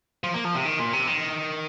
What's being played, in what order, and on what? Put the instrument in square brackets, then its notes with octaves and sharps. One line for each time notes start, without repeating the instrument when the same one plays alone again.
[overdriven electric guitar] F3
A#3
F3
C3
D#3
A#2
C3
D#3